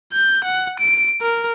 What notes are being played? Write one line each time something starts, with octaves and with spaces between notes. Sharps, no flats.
G6
F#5
D7
A#4